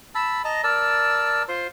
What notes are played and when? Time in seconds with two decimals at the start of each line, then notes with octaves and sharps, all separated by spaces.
0.15 A5 B5 E6
0.44 D#5 A5 A#5
0.64 A#4 D5 A5 E6
1.48 F4 C5 C6